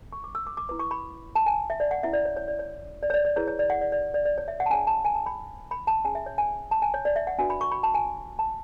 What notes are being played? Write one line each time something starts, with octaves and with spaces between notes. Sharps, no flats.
C#6
D6
E6
D6
D6
E4 B4 D6
C#6
B5
A5
G#5
E5
D5
F#5
C#4 E4 B4 E5
D5
C#5
C#5
D5
C#5
D5
C#5
D5
D5
E4 G#4 B4 C#5
C#5
D5
F#5
D5
D5
D5
D5
C#5
E5
F#5
A5
D4 G#4 C#5 G#5
A5
G#5
A5
B5
B5
A5
C#4 G#4 C#5 G#5
E5
C#5
G#5
A5
G#5
C#5
D5
E5
F#5
D4 F#4 B4 G#5
B5
C#6
B5
A5
G#5
A5